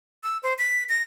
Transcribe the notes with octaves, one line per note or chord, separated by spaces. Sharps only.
E6
C5
B6
A#6